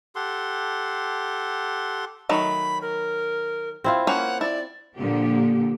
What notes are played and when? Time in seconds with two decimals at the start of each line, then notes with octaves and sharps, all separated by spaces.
0.15 G4 A4 F#5 C6
2.29 D#3 F#3 A3 B5
2.81 A#4
3.84 C4 E4 F4
4.07 A#3 C#4 C5 F#5
4.41 E4 D5
4.95 A#2 D3 F3 A#3 G4